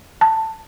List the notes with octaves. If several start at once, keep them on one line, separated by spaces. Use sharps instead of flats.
A5